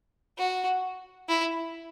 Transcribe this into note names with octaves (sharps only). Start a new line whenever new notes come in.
F#4
E4